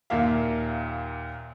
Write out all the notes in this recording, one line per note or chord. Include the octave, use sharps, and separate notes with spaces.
D#2 A#2 A#3 A#4 E5 F5